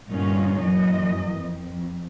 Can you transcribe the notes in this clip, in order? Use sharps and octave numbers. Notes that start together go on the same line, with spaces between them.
G2 A#2 D3 C#4 D#4 F4
F#2 A#2 E3 D#5
F2